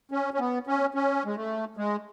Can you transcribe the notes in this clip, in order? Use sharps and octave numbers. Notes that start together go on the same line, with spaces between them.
C#4
C#4
B3
C#4
C#4
G#3
A3
G#3